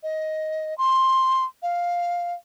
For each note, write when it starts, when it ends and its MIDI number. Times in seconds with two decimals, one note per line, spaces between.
0.03 0.77 75
0.78 1.44 84
1.62 2.33 77